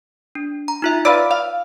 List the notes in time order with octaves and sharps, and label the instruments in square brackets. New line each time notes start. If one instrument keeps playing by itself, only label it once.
[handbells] D4
A#5
D#4 F4 E5
[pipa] F4 B4 D5 [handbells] E6
[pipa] F5